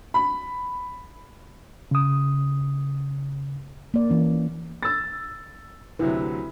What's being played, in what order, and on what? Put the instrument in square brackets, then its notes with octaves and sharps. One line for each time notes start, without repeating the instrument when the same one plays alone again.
[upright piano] B5
[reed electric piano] C#3 D#6
[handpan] A#3 D5
E3 C#4
[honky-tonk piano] E6 A6
[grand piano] D2 C3 F#3 [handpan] E4 B4